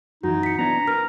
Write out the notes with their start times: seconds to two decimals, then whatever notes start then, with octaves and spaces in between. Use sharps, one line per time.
0.23 F#2 E3 D#4 F#4
0.43 B6 C#7
0.59 B3 D4 E4 A#5
0.88 A#4 B4 F6